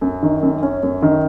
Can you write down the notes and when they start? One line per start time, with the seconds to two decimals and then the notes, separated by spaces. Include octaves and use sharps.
0.01 F#2
0.22 D#3
0.42 F#2
0.62 C#4
0.83 F#2
1.02 D#3